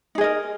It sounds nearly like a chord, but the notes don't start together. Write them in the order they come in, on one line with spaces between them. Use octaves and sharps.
D#4 G#4 D#5 A#4